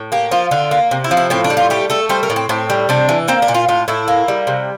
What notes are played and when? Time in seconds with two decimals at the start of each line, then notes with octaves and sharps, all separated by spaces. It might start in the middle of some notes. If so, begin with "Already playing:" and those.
Already playing: A2
0.12 A#3 G4
0.31 F3 F4
0.51 D3 F4
0.71 A#3
0.91 C3
1.04 E4
1.11 F3
1.17 E4
1.30 A2 C4
1.44 D4
1.50 G3
1.57 F4
1.70 A3 G4
1.90 A3 A4
2.09 G3 C5
2.23 A#4
2.30 A2
2.36 C4
2.49 A2 C4
2.70 G3
2.89 C3 D4
3.09 E3
3.28 A#3 C4
3.42 D4
3.48 A#2
3.54 F4
3.69 A2 F4
3.88 A2 E4
4.08 A#3
4.28 G3
4.47 C3